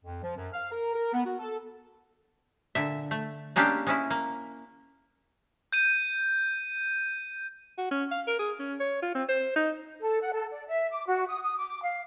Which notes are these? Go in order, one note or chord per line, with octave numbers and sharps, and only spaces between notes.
F2
F3
F#2
F5
A#4
A#4
B3
F#4
A4
A#2 D3 E5
A3
G#3 A#3 C#4 D4 G4 F5
G#3 C#4 E4
A#3
G6 D#7
F#4
C#4
F5
A#4
G#4
C#4
C#5
F4
C4
C5
D#4
A4
F#5
A4
D5
E5
D6
F#4
D#6
D#6
D6
F5